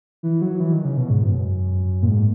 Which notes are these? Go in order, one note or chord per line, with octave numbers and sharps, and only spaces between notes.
E3
F#3
E3
D#3
C#3
B2
G#2
F#2
A#2
G#2